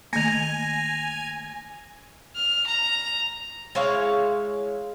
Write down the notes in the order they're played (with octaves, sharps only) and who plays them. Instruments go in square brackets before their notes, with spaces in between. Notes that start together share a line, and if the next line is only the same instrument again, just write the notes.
[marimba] D#3 A3 A#3 [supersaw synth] G#5 [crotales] A#6 F7
[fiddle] F6
A#5
[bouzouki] G#3 E4 C#5 F5